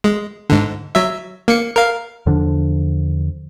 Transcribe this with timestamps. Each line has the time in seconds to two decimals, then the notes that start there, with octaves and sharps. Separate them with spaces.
0.04 G#3
0.50 G#2 D3
0.95 F#3 E5
1.48 A#3 C#7
1.76 A#4 F5
2.26 E2 D3 F3 D4